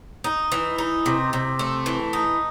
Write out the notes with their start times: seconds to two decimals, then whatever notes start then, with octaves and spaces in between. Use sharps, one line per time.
0.24 D#4
0.52 E3
0.78 D#4
1.06 C3
1.33 C3
1.59 A3
1.86 E3
2.13 D#4